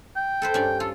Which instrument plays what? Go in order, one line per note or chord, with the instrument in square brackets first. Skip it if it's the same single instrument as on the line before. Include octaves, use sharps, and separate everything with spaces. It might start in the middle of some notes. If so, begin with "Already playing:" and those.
[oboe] G5
[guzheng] A4 B4 C5
G2 C#4 D5
[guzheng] F4 [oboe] A4